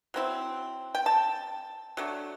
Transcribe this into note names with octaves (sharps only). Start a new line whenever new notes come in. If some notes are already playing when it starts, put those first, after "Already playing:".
F#3 C4 E4
G5
A5
F#3 A3 D4